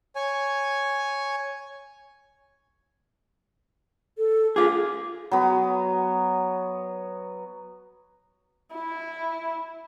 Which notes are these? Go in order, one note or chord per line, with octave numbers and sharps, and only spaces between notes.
C#5 G#5
A4
F4 G#4 C5 F5 D6
F#3 B3
E4